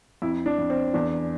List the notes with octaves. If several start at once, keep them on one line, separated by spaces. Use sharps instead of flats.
F2 E4
D4
F2
C4
E2 D4